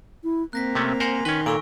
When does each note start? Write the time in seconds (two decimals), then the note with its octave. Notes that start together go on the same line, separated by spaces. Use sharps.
0.24 E4
0.53 A#3 C4 F#6 A#6 B6
0.75 C3 A3 C#4
1.00 A#4 C5 F#5 G#5 C6 A#6
1.25 D#3 C#4 B4 G7
1.46 A#2 A4 C#6 E6 D7